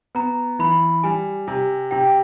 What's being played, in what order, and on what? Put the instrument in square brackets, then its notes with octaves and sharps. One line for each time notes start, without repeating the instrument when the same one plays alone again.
[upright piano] B3 [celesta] A#5
[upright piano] E3 [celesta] B5
[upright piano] G3 [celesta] G#5
[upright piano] C3
[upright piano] C3 [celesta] G5